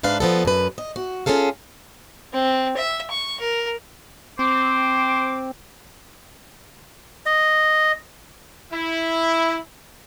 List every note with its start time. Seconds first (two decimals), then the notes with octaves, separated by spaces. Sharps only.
0.03 G#2 D4 B4 F5
0.20 F3 B3 A4
0.45 F#2 B4
0.78 D#5
0.96 F#4
1.26 C#4 F4 G#4 A4 F5
2.33 C4
2.77 E5
3.11 C#6
3.40 A#4
4.39 C4 C5 D6
7.26 D#5
8.71 E4